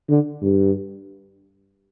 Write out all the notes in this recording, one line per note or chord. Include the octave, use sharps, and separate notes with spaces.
D3
G2